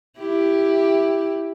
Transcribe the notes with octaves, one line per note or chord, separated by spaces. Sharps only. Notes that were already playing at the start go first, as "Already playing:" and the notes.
E4 G4